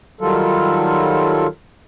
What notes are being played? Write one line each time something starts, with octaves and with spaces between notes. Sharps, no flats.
D#3 F#3 G3 F4 A4